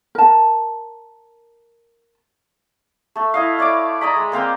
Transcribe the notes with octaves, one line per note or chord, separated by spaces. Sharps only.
A#4 A5
A3 A4
E4 D#5 F5
C#5 D5 B5 D6
D5 D#5 A#5 B5
G#3
A#3 C4 F5 G5